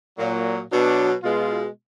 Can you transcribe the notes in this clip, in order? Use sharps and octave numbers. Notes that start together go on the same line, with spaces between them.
A#2 F#3
B2 F#3 D4
B2 G#3 F4